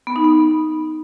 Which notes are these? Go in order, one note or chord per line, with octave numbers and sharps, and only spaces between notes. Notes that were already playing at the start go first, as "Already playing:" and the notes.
B3
D#4
B3